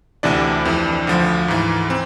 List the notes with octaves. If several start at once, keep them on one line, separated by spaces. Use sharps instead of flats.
D2 C3 E3 D4 D5
F2 E3
D2 D3 F3
G#2 E3
C4